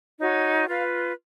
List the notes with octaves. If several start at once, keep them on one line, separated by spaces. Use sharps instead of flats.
D#4 F#4 C#5
F4 B4 F5